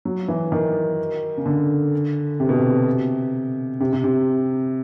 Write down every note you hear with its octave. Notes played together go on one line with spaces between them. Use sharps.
F#3
E3
D#3
C#3
D3
C3
B2
C3
C3
C3
C3